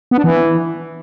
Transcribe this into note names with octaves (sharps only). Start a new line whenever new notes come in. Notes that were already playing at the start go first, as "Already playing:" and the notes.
B3
D4
E3